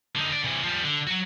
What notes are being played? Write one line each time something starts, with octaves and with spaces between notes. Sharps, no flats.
D3 D#4
D3 D5
C3 E3
F3 G3
D3
F#3 F#4